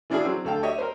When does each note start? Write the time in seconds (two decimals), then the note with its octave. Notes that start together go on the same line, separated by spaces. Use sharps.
0.10 E3 C#4 D4 E4 F#4 G#4
0.25 F#3 C4
0.45 D2 A4 F5 G5
0.63 G4 C#5 D#5 E5
0.78 A#4 C5